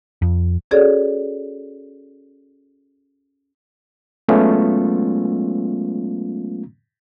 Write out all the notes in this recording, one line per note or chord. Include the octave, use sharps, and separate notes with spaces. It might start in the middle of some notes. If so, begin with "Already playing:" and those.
F2
C#4 F#4 G#4 A4 C#5 D5
F#3 G#3 A3 B3 C#4 F4